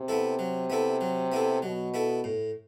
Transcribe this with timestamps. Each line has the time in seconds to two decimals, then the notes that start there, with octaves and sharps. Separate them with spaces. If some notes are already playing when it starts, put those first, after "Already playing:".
Already playing: C3
0.08 B3 E4 A4
0.39 F#3
0.70 B3 E4 A4
1.01 F#3
1.32 B3 E4 A4
1.62 B2 F#3
1.94 B3 E4 A4
2.24 A2